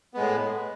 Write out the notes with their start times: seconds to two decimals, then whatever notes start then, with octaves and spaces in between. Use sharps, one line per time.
0.14 B3
0.17 G#3
0.20 A2